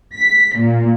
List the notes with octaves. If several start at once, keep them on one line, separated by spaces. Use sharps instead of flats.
B6
A#2